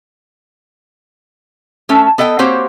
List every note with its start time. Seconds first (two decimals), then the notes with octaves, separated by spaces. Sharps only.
1.89 A3 C#4 A4
2.18 B3 A4 D#5 E5 G5
2.39 A#3 C4 F#4 G4 C5 C#5